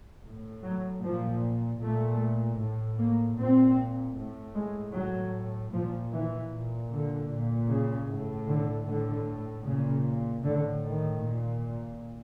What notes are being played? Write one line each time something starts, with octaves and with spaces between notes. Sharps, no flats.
A2
F#3
A#2 F3
A#2 A3
A2
A#3
A#2 C4
A2
G#3
A2 F#3
A#2 F3
E3
A#2
D3
A#2
C#3
A2
D3
A2 D3
A#2 C#3
A2 D3
D#3
A#2